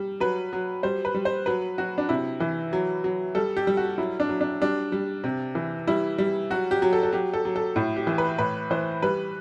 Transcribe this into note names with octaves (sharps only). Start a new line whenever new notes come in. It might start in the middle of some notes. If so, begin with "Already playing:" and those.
Already playing: G3
F#3 B4
F#3
G3 C5
B4
G3
C5
F#3 B4
F#3 F#4
D4
C3 E4
E3
F#3
F#3
G3 A4
G4
G3
F#4
F#3 E4
D4
F#3
D4
G3 D4
G3
C3
E3
G3 E4
G3
F#3 F#4
G4
F#3
A4
A4
F#3 G4
A4
F#3
A4
A2 E4
G4
E3
B4
A2 B4
E3 C5
G3 B4